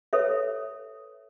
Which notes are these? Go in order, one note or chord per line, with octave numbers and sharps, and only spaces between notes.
A4 B4 C#5 E5